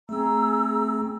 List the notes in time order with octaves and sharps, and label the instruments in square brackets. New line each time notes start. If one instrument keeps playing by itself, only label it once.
[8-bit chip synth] A3 C4 [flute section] G#4 A#5 E6